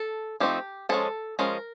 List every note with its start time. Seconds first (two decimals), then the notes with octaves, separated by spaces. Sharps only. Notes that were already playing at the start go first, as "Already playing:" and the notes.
Already playing: A4
0.40 F3 A3 C4 D#4 G4
0.89 F3 G#3 C#4 A4
1.39 F3 G#3 C#4 A#4